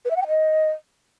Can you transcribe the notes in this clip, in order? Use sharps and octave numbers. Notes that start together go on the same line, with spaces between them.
B4
E5
F#5
G5
D#5